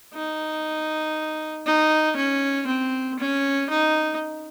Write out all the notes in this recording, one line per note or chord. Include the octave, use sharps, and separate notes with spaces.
D#4
D#4
C#4
C4
C#4
D#4